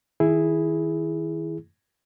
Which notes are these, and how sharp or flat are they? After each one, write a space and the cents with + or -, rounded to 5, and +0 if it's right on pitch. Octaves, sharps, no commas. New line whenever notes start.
D#3 +25 E4 +0 G#4 +0